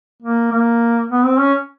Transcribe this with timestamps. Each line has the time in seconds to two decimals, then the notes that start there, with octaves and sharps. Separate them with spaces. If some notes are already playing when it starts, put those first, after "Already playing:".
0.23 A#3
0.52 A#3
1.11 B3
1.25 C4
1.40 C#4